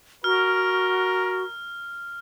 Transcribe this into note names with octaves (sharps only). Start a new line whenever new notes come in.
F#4 A#4 F6